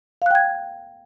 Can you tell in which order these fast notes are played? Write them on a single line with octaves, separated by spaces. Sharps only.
F5 F#6 G5 G#6